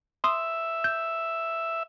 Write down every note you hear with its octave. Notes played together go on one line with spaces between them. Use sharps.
E5 C6 D#6
G6